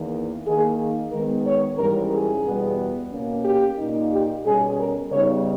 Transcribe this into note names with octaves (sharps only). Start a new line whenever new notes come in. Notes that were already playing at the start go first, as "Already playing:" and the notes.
Already playing: E2 D#3 A#3
D#3 A#3 D#4 G#4
D#3 G#3 B3 A#4
C#5
G#2 E3 G3 C#4 A#4
G#4
E2 B2 G3 B3
B2 A#3 C#4
G4
A#2 A#3 D#4
G4
B2 G3 C#4 G#4
A#4
C#3 G3 B3 D#4 C#5